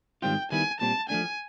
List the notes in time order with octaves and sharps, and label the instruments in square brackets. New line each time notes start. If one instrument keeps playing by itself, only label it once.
[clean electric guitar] G#2 D#3 G3 C4 F4 [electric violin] G5
[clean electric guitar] D#3 G3 B3 E4 [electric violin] G#5
[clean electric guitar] A#2 G3 C4 [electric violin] A5
[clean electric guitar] F3 A3 D4 [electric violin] G#5